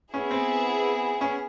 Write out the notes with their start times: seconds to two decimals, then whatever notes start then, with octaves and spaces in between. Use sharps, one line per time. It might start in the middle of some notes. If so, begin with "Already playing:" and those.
0.13 B3 C#4 E4 G#4
0.31 C4
1.21 C#4